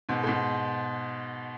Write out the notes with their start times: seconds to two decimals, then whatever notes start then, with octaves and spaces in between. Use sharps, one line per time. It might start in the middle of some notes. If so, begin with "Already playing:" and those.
0.09 G#2 B2
0.23 A2
0.27 G#2 B2